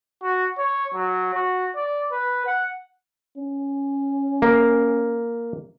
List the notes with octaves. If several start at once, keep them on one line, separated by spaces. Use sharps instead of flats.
F#4
C#5
F#3
F#4
D5
B4
F#5
C#4
A#3